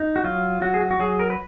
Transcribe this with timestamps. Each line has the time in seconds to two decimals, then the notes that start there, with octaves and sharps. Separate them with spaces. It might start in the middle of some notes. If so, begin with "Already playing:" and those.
Already playing: D#4
0.16 F#4
0.24 F#3 F4
0.62 F#3 F#4
0.74 G#4
0.80 F#4
0.91 F#4
0.99 F#3 G#4
1.19 A#4
1.30 B4